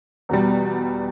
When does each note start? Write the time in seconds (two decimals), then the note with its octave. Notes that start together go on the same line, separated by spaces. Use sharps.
0.29 E2 B2 G3